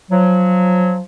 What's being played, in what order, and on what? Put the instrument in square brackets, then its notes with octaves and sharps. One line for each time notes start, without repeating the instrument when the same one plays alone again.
[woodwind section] F3 F#3